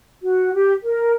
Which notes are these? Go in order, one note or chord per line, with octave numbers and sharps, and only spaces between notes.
F#4
G4
A#4